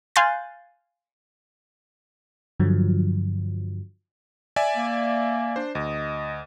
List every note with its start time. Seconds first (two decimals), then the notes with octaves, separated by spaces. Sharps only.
0.16 F5 G#5 C6 F#6 G6 A6
2.60 G2 D3 F3 F#3
4.56 D5 E5 G#5
4.77 A#3
5.56 D4 C5
5.75 D2 D#5